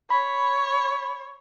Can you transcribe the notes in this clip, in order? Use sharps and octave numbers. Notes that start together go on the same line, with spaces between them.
C#5 B5